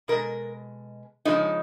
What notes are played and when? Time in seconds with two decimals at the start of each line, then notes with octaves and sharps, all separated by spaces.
0.08 B2 G#3 A#4
1.25 C#3 F3 G#3 D#4